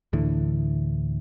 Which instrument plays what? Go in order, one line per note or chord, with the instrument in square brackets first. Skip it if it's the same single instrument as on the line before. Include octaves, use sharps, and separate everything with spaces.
[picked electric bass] D2 A2 D3 E3